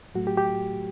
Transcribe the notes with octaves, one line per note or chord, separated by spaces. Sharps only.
A2 F#3 A3 F#4
G4
G4